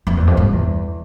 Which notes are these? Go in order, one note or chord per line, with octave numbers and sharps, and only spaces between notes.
F2
E2
F2
G2
E2